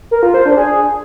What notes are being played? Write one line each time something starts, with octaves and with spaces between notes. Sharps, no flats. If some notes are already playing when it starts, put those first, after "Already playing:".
A#4
F4
C5
D4
G#4